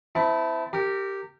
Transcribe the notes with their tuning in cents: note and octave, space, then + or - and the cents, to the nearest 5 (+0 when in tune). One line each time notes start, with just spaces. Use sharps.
C4 -35 E4 +0 A5 +0
G4 -5 A#4 -30